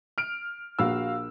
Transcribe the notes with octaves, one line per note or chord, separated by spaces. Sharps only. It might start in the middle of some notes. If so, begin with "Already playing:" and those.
F6 D7
A#1 F#4 F5 E6